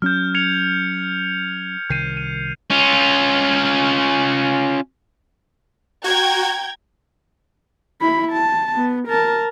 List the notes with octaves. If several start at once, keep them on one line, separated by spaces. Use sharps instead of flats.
F#3 C#4 F6 G6
G#6 C#7 F7
C2 D#3 G6 C7 D#7
D#7
C#4 F4
F#4 G5 A#5 G#6
E4 B5
A5
B3
A#4 A5